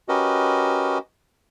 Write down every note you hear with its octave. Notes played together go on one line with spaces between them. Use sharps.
C#4 F#4 G4 A#4 B4 D#5